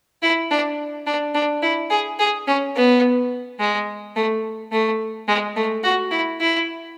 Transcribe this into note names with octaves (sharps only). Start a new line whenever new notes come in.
E4
D4
D4
D4
E4
G#4
G#4
C#4
B3
G#3
A3
A3
G#3
A3
F#4
E4
E4